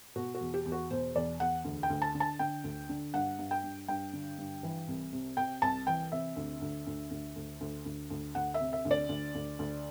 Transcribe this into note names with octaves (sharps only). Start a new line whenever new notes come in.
B2 F#4
F#4
E2
G4
E2
F#4
B2 C5
E2 D5
E2 F#5
D2
G5
D2
A5
D3
A5
D3 G5
D2
D3
G2 F#5
G2
G5
G2
G2 G5
D3
G2
E3
C2
C3
C3 G5
C2 A5
E3 G5
C3 E5
D2
D2
D2
D2
D2
D2
D2
D2
D2 F#5
E5
C3
E5
D2
D5
D2
D2
D2